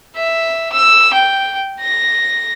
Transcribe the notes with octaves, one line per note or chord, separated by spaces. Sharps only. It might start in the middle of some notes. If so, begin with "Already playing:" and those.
E5
E6
G5
A#6